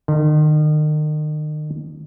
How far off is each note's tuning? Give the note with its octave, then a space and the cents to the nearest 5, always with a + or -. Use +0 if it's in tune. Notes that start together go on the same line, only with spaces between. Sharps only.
D#3 -40